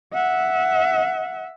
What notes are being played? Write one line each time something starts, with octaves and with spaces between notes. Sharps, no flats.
E5 F#5